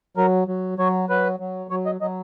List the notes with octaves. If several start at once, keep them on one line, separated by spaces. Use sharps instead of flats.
F#3 A#4
F#3
F#3 C#5
F#3 B4
F#3
F#3 C#5
D#5
F#3 D#5